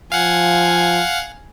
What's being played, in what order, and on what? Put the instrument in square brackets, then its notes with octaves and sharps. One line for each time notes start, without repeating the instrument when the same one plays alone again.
[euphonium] F3 [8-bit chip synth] F5 F#5 [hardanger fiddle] G#5